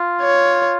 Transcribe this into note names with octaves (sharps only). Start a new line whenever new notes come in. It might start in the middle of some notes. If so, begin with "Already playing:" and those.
Already playing: F4
C#5